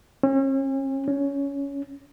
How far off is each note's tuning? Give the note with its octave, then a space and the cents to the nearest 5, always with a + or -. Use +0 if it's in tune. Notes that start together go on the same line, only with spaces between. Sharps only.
C#4 -40
C#4 +15